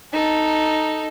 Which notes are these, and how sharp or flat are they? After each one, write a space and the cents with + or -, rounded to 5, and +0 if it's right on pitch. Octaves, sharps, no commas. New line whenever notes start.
D#4 +0 A4 +0